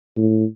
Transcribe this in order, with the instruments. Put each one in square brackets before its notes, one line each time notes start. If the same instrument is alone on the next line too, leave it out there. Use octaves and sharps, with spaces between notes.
[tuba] A2